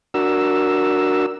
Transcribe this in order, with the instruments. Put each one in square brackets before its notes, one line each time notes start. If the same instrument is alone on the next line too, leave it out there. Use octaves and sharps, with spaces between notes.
[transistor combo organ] D4 F#4 A#4 E6